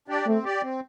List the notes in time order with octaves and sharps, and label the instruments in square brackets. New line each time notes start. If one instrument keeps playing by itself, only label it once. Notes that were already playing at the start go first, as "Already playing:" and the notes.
[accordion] D4 G4 D5
[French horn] A3 [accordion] C4
[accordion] G4 D5
C4